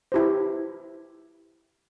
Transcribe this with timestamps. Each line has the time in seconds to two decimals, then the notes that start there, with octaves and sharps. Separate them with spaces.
0.12 E4 G4 C5